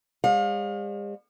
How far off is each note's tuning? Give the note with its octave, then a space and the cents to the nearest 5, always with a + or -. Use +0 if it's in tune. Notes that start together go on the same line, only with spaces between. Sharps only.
G#3 -45 C#5 -35 F5 +30